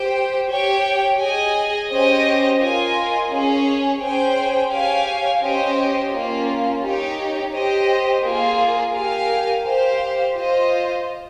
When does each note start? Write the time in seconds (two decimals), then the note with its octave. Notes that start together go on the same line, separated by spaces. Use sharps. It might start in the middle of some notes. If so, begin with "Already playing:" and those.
Already playing: G4 C5 G5
0.48 G4 C#5 G5
1.18 G#4 D#5 G#5
1.89 C#4 G4 C5 D#5
2.60 F4 A#4 D#5 G#5
3.30 C#4 G#4 C#5
4.00 C#4 G#4 C5 G5
4.71 G4 C#5 F5 G#5
5.41 C#4 G4 C5 D#5
6.12 A#3 C#4 F4
6.83 D#4 G4 C#5
7.53 G4 C5 D#5
8.23 A#3 F4 G#4
8.94 G4 A#4 F5 G#5
9.64 G4 C5 F5
10.34 F4 C5 D#5